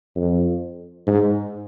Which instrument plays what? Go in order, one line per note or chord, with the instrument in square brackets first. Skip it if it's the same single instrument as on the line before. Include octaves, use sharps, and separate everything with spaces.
[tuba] F2
G#2